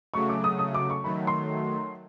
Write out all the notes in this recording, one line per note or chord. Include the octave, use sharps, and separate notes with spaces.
C#3 F#3 A3 C#6
D6
D#6
D#6
D6
C#6
D#3 F#3 A3 B5
C6